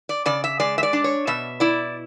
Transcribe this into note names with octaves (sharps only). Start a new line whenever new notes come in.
D5
C#3 D5
E5
G#3 D5
E5
D5
D4
C#5
B2 E5
E4 D5